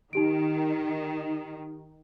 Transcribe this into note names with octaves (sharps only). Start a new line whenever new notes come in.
D#3 D#4 G4 D7